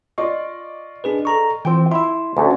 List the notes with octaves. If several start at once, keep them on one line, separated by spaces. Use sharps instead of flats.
F4 D5 D#5 C#6
D4 G#4 B4
A4 A#5 C#6
E3 C4 F4 G5
E4 E5 C6
D2 C#4 F#4 A4